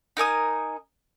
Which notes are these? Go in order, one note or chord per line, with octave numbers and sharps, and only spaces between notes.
D#4 A#4 G#5 D#6